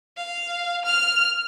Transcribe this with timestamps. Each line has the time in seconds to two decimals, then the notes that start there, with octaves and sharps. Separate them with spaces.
0.17 F5
0.85 F6